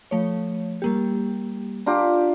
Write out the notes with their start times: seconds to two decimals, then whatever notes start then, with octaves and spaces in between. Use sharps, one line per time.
0.11 F3 A3 C#5
0.82 G3 A#3 G4
1.86 D4 F4 G4 A#5 D6